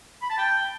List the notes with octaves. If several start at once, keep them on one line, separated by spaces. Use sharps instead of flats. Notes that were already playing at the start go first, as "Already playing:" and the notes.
B5
A5
G5